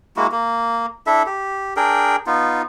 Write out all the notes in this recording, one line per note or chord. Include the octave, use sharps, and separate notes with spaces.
G#3 A#3 E4 F#4
A#3
D4 E4 A4 E5
G4
D4 G#4 A#4 G5
B3 D#4 F4